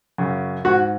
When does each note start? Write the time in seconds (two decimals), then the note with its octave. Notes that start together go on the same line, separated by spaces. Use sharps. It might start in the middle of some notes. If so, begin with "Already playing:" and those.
0.18 F#2 C#3
0.65 G#2 F#4